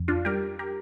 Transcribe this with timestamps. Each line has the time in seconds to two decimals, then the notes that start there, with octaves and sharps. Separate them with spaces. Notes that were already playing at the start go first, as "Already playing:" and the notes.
Already playing: F2
0.08 D4 F4
0.25 G3 G4 A#4
0.59 G4 A#4